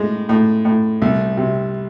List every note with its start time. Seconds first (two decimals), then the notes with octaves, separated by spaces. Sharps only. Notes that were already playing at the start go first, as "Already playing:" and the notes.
Already playing: A2 G#3
0.29 A2
0.65 A2
1.02 C2
1.37 C3